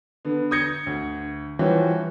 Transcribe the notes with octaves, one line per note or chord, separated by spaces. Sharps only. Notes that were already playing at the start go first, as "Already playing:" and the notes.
D3 B3
D#6 G6 G#6 A#6 C#7
D2
E3 F3 G3 F#4 C#5